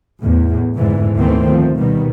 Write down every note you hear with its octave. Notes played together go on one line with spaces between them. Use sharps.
E2 A2
F2 G#2 D3 E3
D2 D#3 E3 A3 B3 C4
F3
B2 D#3 G3 B3